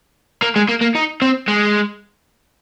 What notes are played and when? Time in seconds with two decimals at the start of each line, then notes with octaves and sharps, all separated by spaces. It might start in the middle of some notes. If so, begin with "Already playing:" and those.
0.42 A#3
0.56 G#3
0.69 A#3
0.81 A#3
0.95 D#4
1.22 C4
1.48 G#3